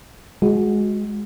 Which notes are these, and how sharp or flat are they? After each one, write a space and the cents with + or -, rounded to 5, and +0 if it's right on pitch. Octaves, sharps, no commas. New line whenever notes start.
G#3 +5 F#4 -20